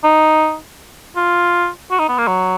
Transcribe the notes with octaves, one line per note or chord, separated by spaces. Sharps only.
D#4
F4
F#4
D#4
B3
A#3
F#3